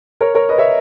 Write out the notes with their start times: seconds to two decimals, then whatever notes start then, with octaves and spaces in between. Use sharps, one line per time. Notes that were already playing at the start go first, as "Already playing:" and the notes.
0.21 A#4 C#5
0.34 A#4 C#5
0.49 B4 D#5
0.58 C#5 E5